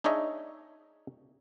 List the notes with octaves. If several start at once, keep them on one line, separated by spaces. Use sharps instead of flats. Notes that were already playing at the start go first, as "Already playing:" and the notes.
D4 D#4 G#4 C#5 D#5 E5